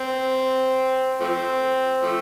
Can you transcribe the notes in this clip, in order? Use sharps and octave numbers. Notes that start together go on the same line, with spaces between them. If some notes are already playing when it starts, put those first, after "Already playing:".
Already playing: C4
F3 A3 C4
F3 A3